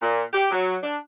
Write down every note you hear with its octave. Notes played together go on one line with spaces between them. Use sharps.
A#2
G4
F#3
D4